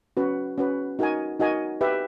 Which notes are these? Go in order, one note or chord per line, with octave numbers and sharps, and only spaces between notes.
C#4 F#4 B4
C#4 F#4 B4
D#4 F#4 A#4 D#5 G#5
D#4 F#4 A#4 D#5 G#5
G4 B4 E5